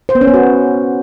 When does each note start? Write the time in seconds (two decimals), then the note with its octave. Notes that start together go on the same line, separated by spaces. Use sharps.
0.09 C5
0.15 B3
0.21 C#4
0.27 B3
0.34 F#4